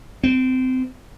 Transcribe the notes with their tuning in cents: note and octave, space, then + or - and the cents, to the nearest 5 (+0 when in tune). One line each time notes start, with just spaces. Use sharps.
C4 -25